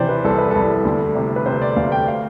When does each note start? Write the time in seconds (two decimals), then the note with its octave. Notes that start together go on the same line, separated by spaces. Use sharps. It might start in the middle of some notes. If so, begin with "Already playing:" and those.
Already playing: C3 E3 C5 D5 G5
0.09 B4
0.24 C2 A4
0.39 B4
0.51 C2 A4
0.85 D2
1.15 C3
1.36 B4
1.46 C3 C5
1.62 D5
1.76 D2 F5
1.92 G5
2.08 F5